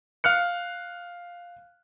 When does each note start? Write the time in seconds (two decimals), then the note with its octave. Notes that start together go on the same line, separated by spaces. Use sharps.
0.24 F5 F6 F#6 C#7